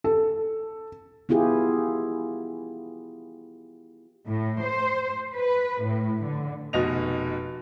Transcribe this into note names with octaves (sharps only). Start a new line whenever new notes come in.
A4
B3 E4 F4 G4 G#4
A2
C5
B4
A2
D3
F1 B2 D#5 F7